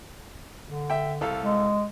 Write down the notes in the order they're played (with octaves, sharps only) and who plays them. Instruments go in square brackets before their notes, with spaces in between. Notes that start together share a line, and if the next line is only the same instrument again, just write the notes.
[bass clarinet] D3
[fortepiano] E5 G5
C2 A4 F5
[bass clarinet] G#3